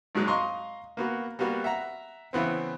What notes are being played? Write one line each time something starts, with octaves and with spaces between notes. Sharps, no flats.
G#1 G#2 F#3 G#3
D#5 F5 A#5 C6 C#6
A#3 B3 F#4
G3 A#3 B3 F#4
E5 F#5 A#5
C#3 E3 B3 C4